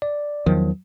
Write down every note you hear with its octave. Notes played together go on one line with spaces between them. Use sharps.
D5
E2 D#3 F3 F#3